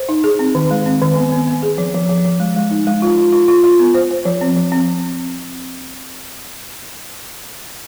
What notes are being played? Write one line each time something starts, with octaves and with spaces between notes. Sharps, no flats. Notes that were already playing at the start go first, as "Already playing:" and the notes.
Already playing: C5
D#4
G#4
C4
D#3
G#3
C4
D#3
B3
B3
B3
G#4
F3
F3
F3
F3
G#3
G#3
D#4
G#3
F4
F4
F4
F4
F4
B3
C5
C5
F3
C4
F3
C4